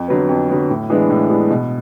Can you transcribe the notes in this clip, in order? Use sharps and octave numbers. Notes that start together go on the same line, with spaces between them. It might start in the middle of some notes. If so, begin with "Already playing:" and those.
Already playing: F2
D3 F#3 B3
F2
D3 F#3 B3
A2
E3 G#3 B3 D4
A2
E3 G#3 B3 D4
B2